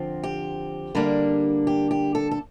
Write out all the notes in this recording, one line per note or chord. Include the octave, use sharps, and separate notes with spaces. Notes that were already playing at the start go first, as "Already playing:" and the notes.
Already playing: D3 F3 C4
G4
D3 G3 A#3 D4
G4
G4
A4
A4